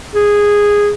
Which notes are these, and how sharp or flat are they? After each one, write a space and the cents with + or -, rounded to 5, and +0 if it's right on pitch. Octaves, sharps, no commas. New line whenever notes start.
G#4 -10